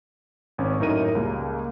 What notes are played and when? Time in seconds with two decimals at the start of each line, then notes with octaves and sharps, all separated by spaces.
0.58 G#1 C#4
0.79 F#2 A2 D#4 A#4 D#7
1.15 C#2 G3 A#3